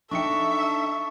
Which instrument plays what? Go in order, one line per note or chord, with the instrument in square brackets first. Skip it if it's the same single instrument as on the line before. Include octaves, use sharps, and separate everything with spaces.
[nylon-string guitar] D4 D#4 G5 [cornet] A4 [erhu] E5 [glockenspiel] C#6 C#7